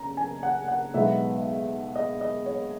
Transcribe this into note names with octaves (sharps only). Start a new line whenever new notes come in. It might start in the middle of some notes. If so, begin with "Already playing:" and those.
Already playing: C#3 A#5
G#5
F#5
F#5
B1 B2 G#3 B3 D#4 E5
D#5
D#5
C#5